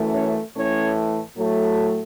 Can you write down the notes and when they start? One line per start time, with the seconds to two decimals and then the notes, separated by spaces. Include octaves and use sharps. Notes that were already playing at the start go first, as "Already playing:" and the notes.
Already playing: F#2 E3 A3
0.14 C#4 C#5
0.55 A2 E3 A3 C#4 C#5
1.36 A2 F#3 A3